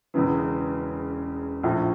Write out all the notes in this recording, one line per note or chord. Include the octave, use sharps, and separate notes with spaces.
E1 E2 C#3 E3
A#1 A2 F3